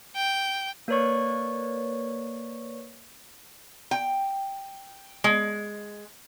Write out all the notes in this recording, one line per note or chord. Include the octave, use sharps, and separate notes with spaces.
G5
A#3 A#4 B4 C#5 D5 C#6
G5
G#3